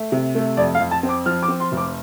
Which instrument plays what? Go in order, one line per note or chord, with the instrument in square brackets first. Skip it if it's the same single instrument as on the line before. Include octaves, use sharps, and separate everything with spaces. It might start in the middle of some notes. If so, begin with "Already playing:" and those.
Already playing: [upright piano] A3
C3
A3
F2 D5
F5
F2
A5
C4
D6
F3 F6
D6
C4
C6
F1
D6